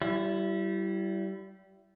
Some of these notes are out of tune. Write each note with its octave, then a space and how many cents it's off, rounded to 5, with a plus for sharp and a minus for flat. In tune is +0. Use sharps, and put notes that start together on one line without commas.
G3 -25 E4 +20